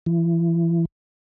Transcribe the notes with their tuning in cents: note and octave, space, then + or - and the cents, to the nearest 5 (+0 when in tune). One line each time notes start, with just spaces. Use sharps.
E3 +30